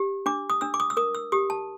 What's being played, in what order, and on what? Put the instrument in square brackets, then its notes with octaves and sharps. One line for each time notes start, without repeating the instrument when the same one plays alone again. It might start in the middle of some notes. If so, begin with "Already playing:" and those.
Already playing: [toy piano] G4
D4 D6
D#6
D4 E6
D6
D#6
E6
A#4 D#6
E6
G4 D#6
A5